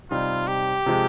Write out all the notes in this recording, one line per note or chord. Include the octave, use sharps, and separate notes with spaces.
C3 G3 C4 D#4 F4
G4
C3 F3 G#3 C4